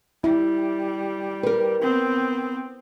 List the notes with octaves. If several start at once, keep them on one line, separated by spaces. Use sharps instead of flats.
G3 E4
A#4 B4
B3 C4